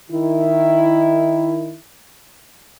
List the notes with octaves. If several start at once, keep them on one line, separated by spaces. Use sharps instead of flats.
D#3 E4